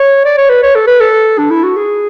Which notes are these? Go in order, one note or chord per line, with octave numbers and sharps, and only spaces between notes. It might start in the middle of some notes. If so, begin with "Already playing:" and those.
Already playing: C#5
D5
C#5
B4
C#5
A4
B4
A4
D4
E4
F#4
G#4